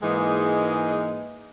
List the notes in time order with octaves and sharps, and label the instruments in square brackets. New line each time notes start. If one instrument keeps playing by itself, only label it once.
[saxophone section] G#2 E3 G#3 A#3 D#4